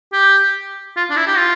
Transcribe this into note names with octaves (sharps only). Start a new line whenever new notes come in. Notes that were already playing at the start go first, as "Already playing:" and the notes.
G4
F4
D4
E4
G4
F4